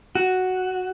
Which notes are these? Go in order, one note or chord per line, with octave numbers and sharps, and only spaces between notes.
F#4